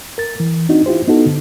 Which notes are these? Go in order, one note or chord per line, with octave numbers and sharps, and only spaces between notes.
A#4 A6
E3
C4 D4 D#4 F#4
E4 F4 G4 C5
B3 D#4 E4 F#4 A4
D3